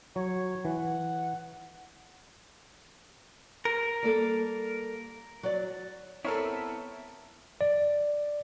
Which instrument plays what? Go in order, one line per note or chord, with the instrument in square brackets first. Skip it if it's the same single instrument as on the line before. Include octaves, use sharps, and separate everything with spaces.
[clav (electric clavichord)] F#3 [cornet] C#5
[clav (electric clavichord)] E3 [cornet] F#5
[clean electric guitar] A#4
[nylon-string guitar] G3 A#3 A4
F#3 D5
[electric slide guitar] B3 C4 E4 [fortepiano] A4 A#4 C#5
[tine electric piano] D5